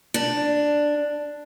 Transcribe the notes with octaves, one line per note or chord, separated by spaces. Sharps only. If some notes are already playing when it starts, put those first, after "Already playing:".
D4